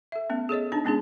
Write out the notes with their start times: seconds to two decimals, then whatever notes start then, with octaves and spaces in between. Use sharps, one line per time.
0.12 A4 E5
0.30 A3 B3 C#4
0.49 G#4 A4 C#5 D#5
0.72 D4 D#4 A5
0.85 G#3 B3 C#4 D4 E4 G#4